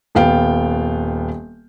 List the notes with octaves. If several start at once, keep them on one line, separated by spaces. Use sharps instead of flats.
D#1 B3 F5 G5